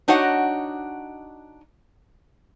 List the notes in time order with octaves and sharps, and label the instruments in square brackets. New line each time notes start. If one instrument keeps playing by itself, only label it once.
[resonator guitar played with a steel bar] D4 D#4 F#4 C#5 D#5 F#5